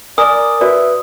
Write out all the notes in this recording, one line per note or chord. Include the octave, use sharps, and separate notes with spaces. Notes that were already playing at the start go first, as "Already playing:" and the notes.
A#4 D5 G#5 D#6
F#4 B4 D5 E5